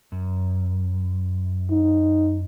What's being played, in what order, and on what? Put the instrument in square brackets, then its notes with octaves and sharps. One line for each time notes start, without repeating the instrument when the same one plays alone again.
[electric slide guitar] F#2
[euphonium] D#4